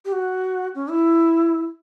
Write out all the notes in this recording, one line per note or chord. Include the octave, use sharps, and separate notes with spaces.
G4
F#4
C#4
E4